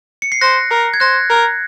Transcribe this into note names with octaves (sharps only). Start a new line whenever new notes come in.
C#7
C7
C5 F#6 A#6
A#4
G#6
C5 F#6 A#6
A#4